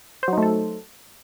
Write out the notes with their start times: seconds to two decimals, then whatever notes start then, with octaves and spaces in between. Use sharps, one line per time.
0.23 C5
0.28 F#3
0.33 D#4
0.38 A3
0.43 A4